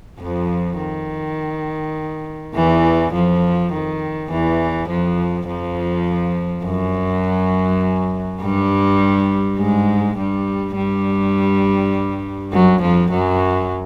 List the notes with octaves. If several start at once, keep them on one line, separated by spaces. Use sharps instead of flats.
F2 F3
D#3
E2 E3
F2 F3
D#3
E2 E3
F2 F3
F2 F3
F#2 F#3
G2 G3
G#2 G#3
G2 G3
G2 G3
F#2 F#3
F2 F3
F#2 F#3